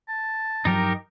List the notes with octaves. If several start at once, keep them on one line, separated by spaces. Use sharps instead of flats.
A5
G2 F3 F#3 D#4 G4 A#4